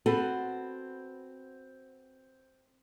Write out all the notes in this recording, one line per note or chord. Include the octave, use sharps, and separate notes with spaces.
C4 F#4 A4 B4